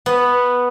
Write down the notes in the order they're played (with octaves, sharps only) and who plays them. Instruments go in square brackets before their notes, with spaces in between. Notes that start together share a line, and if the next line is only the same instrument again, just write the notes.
[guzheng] B3